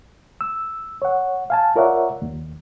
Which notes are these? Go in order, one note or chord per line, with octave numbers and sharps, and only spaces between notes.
E6
C#5 F#5
F5 G#5 A5
F4 A#4 C#5 D5 E5 F#5
D#2